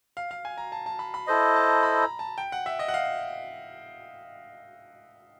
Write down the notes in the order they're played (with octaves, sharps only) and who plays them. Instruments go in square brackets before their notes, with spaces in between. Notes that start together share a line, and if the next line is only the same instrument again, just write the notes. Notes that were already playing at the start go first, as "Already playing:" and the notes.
[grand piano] F5
F5
G#5
A#5
A5
A5
B5
B5
[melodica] E4 A4 C5 D#5
[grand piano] A5
A#5
B5
A#5
A5
G5
F#5
E5
D#5
F#5
F5